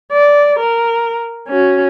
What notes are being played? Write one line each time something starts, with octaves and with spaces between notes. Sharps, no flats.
D5
A#4
C#4 F#4